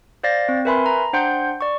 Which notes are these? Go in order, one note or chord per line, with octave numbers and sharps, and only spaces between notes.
C5 D5 F5 A6 A#6
C4
A#4 B4 E5 G#5 B5 C6
A#5
D4 C5 F#5 G5 C6 G6
D5 C#6